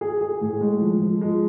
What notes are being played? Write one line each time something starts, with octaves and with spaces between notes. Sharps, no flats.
G#4
G#4
A2
G#3
F3
F3
G#3